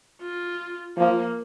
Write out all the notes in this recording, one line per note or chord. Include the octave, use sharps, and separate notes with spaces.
F4
F3 A#3